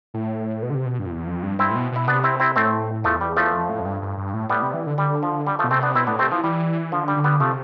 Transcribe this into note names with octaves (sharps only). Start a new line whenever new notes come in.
A2
B2
D3
C3
B2
G2
F2
E2
F2
G2
G2 C4 E4
A2
B2
B2 E4
C3 B3 D4
C4 E4
C4 E4
A2 A3 C4
E2 F3 A3
G3
F3 A3
F2
A2
F2
G2
G2
G2
A2
A2 G3 B3
C3
E3
D3
D3 G3
F3
G3
F3 A3
B2
C3 A3 C4
B3 D4
B2 C4 E4
A2 B3 D4
C3 A3 C4
E3 F3
E3 G3
D3 F3
G3
D3
G3 B3
C3 F3 A3